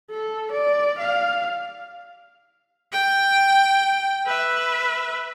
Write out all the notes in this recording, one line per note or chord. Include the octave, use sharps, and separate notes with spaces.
A4
D5
F5
G5
B4 E5